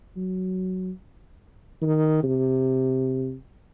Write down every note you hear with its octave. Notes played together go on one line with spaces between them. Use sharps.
F#3
D#3
C3